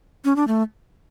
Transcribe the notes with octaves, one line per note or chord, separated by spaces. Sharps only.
C#4
D4
A3